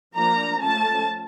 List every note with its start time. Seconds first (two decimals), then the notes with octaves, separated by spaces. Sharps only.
0.14 F3 A#3 D4 A#5
0.60 F3 A3 C#4 A5